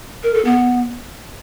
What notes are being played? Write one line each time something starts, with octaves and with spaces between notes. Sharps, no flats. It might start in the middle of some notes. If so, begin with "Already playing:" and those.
A#4
A4
B3